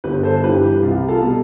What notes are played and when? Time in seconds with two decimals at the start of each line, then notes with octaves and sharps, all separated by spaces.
0.04 G1 G4 B4
0.23 A4 C5
0.43 G2 E3 G4 B4
0.63 G4
0.82 C2 F4
1.08 F4 A4
1.21 B2 G3